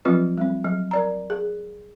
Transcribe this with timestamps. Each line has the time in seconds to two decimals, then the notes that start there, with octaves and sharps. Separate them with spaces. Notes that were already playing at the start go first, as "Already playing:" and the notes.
0.05 F3 F#3 C4 F4 B4
0.38 G3 C4
0.64 F#3
0.91 A#4 D5 A#5
1.30 G#4